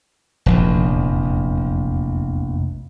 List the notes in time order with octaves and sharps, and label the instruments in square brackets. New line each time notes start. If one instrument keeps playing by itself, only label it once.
[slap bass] F1 A#1 E2